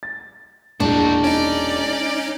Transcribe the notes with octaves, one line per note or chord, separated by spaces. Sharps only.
A6
E1 A#1 D4 D#4 F#4
C#4 D#4 D5